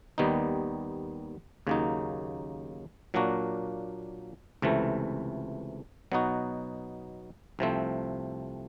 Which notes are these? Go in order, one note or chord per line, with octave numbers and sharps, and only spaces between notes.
D#2 D#3 G3 B3 D#4
D#2 C#3 F#3 A#3 D#4
A#2 F#3 A#3 D4 F#4
C#2 C3 E3 A3
B2 F#3 B3 D#4 F#4
C2 C3 F3 A3 C4